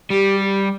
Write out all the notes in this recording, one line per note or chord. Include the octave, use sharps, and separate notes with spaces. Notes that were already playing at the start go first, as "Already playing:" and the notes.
G3 G4
G4